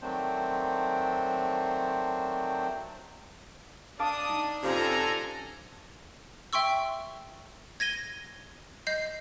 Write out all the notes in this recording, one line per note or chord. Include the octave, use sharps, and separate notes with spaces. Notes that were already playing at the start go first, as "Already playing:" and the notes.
D#3 F#3 A3 C4 D4 C5
D4 F5 A5 D6 D#6
D#4
F2 C3 F3 C#4 A4 G#5 A#5
E5 G5 C6 C#6 E6
G#6 A#6 D#7 G7
D#5 G6 C7